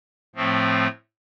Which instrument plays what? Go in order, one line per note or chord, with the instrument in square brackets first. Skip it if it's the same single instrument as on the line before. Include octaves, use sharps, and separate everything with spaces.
[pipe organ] A2 F3 A3 C4